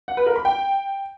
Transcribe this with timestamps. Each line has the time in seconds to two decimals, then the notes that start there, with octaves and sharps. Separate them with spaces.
0.08 F#5
0.17 B4
0.26 A#4
0.36 B5
0.45 G5